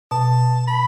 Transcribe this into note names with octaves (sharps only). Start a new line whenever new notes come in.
B2 A5
B5